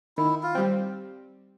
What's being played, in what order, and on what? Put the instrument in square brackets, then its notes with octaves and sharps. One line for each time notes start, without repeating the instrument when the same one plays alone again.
[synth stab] D#3 [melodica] E4
[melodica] F4
[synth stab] G3 C4